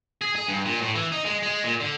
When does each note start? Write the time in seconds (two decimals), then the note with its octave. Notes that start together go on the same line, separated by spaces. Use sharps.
0.21 G#4
0.36 G#4
0.48 G2
0.65 A#2
0.81 A2
0.95 E3
1.12 D#4
1.25 G#3
1.43 G#3
1.63 A#2
1.80 D3